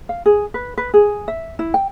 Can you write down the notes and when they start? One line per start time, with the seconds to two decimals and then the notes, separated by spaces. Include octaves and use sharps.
0.09 F5
0.26 G#4
0.54 B4
0.78 B4
0.94 G#4
1.28 E5
1.59 E4
1.74 G5